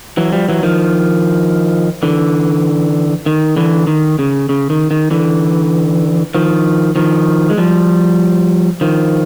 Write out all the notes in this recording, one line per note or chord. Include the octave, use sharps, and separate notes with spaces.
E3 F#3
F3 G3
E3 F#3
D#3 F3
D3 E3
D#3
D3 E3
D#3
C#3
C#3
D#3
D#3
D3 E3
D#3 F3
D#3 F3
G#3
F3 G3
D#3 F3